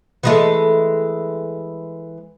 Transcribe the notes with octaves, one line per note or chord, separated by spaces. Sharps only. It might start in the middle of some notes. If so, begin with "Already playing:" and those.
E3 G#3 A3